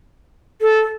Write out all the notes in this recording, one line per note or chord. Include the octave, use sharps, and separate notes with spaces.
A4